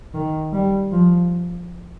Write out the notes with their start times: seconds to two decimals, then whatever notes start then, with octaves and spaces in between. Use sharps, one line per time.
0.14 D#3
0.53 G3
0.92 F3